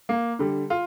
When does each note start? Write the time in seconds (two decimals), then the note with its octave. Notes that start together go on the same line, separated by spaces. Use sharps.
0.09 A#3
0.39 D3 G3
0.70 F4